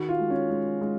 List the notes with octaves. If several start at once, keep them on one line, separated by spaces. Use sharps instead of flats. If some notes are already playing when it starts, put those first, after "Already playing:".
Already playing: D#3 F#4
F4
G#3
C#4
G#3
G#3